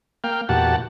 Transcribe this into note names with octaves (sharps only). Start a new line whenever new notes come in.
A#3 F5 G5
E2 A#2 F#4 G4 F#5 A5